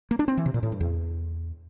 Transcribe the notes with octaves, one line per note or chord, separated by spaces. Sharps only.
A#3
D4
C4
E3
C3
A#2
A2
G2
E2